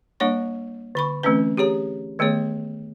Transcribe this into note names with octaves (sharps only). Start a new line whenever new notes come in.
G3 A#3 D4 C#5 C#6
D3 B5 C#6
E3 A3 C4 C#4 B4
G4 G#4 C#5 A#5
D#3 A3 B3 G#4 C#5